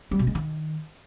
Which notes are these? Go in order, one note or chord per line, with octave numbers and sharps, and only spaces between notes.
G3
B2
G#3
D#3